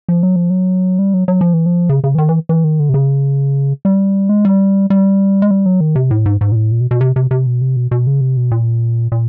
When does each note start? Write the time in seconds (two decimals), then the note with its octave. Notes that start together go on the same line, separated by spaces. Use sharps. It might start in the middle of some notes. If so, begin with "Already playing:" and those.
0.09 F3
0.23 F#3
0.36 F3
0.50 F#3
0.99 G3
1.14 F#3
1.28 F#3
1.41 F3
1.54 E3
1.66 F3
1.89 C#3
2.04 C#3
2.15 E3
2.18 D#3
2.29 E3
2.49 E3
2.64 D#3
2.79 D3
2.89 C3
2.94 C#3
3.85 G3
4.29 G#3
4.45 G3
4.90 G3
5.42 G#3
5.51 G3
5.66 F#3
5.81 D#3
5.95 C3
6.11 A2
6.26 G#2
6.41 G#2
6.52 A#2
6.56 A2
6.71 A#2
6.81 B2
6.91 B2
7.01 C3
7.16 C3
7.31 C3
7.46 B2
7.62 C3
7.76 B2
7.91 B2
8.07 C#3
8.21 C3
8.37 B2
8.51 A#2
9.12 A#2